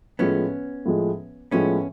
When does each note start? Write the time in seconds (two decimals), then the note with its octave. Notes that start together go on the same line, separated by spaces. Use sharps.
0.19 A2 F3 G#3 B3 C#4
0.86 A2 F3 G#3
1.51 A2 F3 G#3 B3 C#4